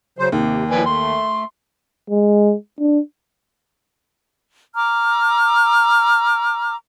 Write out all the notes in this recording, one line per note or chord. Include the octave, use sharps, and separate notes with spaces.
C#3 F#3 C5
D#2 C3
A2 F3 B4 D5 G#5
A3 C6
G#3
D4
A#5 D6 F6